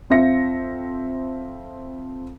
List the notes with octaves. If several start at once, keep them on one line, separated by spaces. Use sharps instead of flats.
F2 C4 F4 E5 A#6 C#7